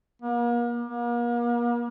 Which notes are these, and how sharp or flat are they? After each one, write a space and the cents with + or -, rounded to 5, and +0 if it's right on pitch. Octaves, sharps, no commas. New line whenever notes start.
A#3 +40
A#3 +40